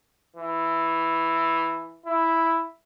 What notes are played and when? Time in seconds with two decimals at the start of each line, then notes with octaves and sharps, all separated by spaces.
0.36 E3
2.06 E4